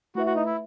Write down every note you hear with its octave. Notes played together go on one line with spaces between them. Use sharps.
A3 E4 F#4 B4 E5
F#4
D#4
E4